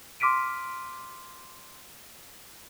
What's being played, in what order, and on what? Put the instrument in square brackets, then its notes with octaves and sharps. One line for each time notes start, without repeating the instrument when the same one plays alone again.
[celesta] C6 D6 F6 B6 D7 D#7